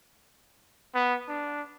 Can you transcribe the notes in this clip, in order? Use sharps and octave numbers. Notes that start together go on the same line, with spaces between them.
B3
D4